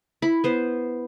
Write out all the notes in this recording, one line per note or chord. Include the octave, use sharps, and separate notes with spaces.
E4 B5
B3 C5